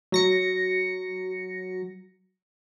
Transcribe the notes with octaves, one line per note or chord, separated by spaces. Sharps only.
F#3 A#6 C#7